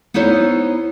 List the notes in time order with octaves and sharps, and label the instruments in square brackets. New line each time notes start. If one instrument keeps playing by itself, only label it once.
[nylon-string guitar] B3 D#4 E4 C5 C#5